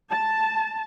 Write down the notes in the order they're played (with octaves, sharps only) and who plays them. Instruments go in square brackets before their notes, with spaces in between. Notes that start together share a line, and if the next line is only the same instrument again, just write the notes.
[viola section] A5